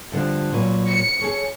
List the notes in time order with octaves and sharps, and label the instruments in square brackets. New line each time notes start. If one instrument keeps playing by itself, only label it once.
[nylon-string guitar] G2 D3 F3
A#2 F#3 B4
[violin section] C#7
[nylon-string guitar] G#4 A4 C#5